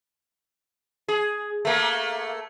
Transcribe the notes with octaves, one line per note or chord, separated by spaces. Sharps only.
G#4
A3 A#3